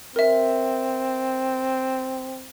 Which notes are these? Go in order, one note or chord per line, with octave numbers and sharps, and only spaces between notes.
C4 A#4 E5